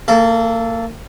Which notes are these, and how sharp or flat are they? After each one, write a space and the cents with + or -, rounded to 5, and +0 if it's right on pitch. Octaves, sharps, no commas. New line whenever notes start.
A#3 -30 A4 +0